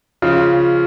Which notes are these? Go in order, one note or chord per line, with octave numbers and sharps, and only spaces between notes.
C#3 F3